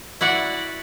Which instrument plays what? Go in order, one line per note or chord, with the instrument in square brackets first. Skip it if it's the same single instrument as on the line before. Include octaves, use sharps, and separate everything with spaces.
[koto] E4 F#4 D5 F#5